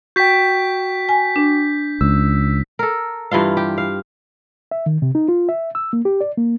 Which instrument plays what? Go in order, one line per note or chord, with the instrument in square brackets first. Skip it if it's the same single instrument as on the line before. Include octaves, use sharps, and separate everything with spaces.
[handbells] F#4 G5 [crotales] G6 B6
[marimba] G#5
D4
[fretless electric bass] C#2 [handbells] E6
[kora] A4 A#4
G2 E3 F4 F5
G4
F5
[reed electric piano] E5
D#3
C3
D#4
F4
E5
E6
A#3
G4
D5
A#3